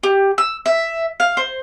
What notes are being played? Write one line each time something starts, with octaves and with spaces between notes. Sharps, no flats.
G4
E6
E5
F5
C5